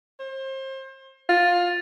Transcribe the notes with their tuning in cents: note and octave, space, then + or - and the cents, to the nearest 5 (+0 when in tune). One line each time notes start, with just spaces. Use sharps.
C5 +30
F4 +15